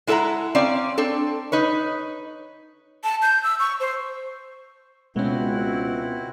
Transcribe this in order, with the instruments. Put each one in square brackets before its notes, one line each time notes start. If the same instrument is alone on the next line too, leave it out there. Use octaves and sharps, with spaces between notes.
[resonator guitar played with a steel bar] G#3 E4 A4 B4 F#5 A#5
C4 C#4 D5 F5
C4 D4 A4
D#4 B4 C#5
[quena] A5
G6
E6
C#6
C5
[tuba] C#2 [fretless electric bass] B2 [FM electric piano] G#3 C#4 [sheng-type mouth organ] C4 E4 F#4